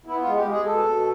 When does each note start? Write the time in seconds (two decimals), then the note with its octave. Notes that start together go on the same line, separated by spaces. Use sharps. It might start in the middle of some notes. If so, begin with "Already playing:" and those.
0.06 B3 E4
0.22 F4
0.27 G#3
0.36 G4
0.46 G#3
0.51 G#4
0.66 B2 A4
0.86 B2